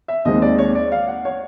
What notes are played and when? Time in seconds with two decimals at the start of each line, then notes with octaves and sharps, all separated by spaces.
0.08 E5
0.25 D#2 D#3 G#3 C4 D#5
0.42 D5
0.58 C#5
0.75 D5
0.92 F5
1.08 F#5
1.25 C#5